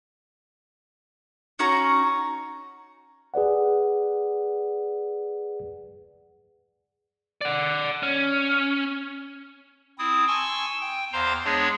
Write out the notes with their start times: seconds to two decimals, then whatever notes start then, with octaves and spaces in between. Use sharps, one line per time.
1.59 C#4 D#4 F#4 A#5
3.34 G#4 B4 D5 F#5
7.41 D5 F#5
8.03 C#4
9.99 C4 E4 D#6
10.27 G#5 A5 C6 C#6 E6
10.81 G5
11.13 E2 C5 F5 A#5 C6
11.44 G#3 B3 D4 G#4 C#5